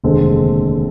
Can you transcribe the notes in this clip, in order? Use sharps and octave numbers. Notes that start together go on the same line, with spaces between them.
F1 D#2 D3 G#3 C4